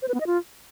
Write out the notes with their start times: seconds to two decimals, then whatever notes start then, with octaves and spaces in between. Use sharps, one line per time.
0.02 C5
0.08 B4
0.14 B3
0.20 D#5
0.27 F4